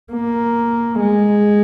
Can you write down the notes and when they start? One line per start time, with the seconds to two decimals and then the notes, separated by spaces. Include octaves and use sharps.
0.13 A#3
1.00 G#3